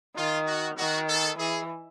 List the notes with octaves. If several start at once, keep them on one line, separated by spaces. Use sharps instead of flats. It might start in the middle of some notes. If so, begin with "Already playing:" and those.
D#3 F4
F#4
D#3 F#4
A4
E3 G#4